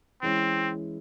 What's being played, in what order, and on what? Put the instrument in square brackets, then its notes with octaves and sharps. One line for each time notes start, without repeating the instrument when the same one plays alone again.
[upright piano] E3 G#3 C#4 E4 [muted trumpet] C4